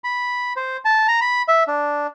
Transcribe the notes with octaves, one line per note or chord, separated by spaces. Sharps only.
B5
C5
A5
A#5
B5
E5
D4